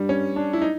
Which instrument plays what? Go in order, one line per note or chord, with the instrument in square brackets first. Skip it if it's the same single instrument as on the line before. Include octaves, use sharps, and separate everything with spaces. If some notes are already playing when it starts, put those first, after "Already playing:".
Already playing: [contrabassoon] G2 [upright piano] G3
[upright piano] C#4
D4
E4
D#4